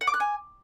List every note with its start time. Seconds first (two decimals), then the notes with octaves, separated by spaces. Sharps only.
0.01 F#5
0.07 D6
0.14 F#6
0.20 G#5